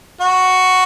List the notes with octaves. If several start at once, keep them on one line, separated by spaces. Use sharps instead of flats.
F#4